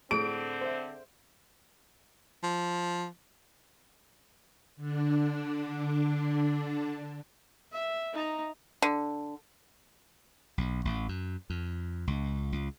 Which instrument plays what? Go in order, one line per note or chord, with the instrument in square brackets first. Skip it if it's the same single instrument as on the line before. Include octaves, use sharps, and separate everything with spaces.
[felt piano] A2 [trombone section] D3 C4 [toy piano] G#4 A4 [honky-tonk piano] D7
[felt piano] C5 E5
[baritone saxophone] F3
[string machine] D3 D4
[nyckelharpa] E5
D#4 A#5
[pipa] D3
[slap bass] B1
A1
F#2
F2
C#2
C#2